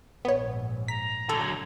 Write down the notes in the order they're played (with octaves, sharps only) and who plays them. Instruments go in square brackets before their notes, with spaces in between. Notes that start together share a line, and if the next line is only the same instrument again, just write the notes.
[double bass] A#1 G#2 [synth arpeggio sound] B3 C#5
[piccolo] A#5 [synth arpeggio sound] B6
[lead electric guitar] D3 F#3 [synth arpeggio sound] A4